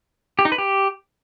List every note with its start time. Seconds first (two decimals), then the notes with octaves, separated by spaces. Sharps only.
0.39 G4
0.45 D#4
0.52 B4
0.58 G4